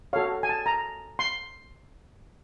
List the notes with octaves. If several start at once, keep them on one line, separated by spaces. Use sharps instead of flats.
F#4 A4 C#5 F5
G#5
A5
A#5
C6